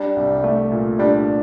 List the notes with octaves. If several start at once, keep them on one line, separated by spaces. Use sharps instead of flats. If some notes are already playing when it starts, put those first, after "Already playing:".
Already playing: G3 D4
C2
A3
A#2
G3 D4